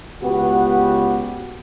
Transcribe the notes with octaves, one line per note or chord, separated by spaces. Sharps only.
C#2 B3 F#4 G4 B4